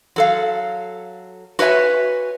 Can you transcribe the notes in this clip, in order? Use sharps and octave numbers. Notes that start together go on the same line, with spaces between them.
F#3 A4 F5
F#4 B4 C#5 E5 G#5